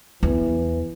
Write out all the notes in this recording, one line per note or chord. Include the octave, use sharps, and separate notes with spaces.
E2 E3